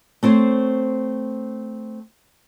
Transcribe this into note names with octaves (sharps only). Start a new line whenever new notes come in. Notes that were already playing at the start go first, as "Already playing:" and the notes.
A3 C4 C5 C#5